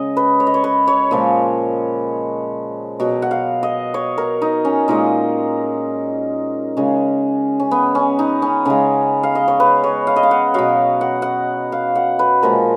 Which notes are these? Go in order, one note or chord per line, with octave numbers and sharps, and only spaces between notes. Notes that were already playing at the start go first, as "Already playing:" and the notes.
Already playing: C#3 G#3 D#5
B4
C#5
D#5
C#5
B4
C#5
A#2 F3 G#3
B2 F#3
F#5
F5
D#5
C#5
A#4
D#4
C#4
A#2 G#3 D#4
C#3 G#3 C#4
C#4
B3
C#4
D#4
C#4
C#3 G#3 C#4
F5
D#5
C#5
B4
C#5
F5
D#5
F5
F#5
B2 F#3 F5
F#5
F#5
F5
F#5
B4
A#2 F3 G#3 A#4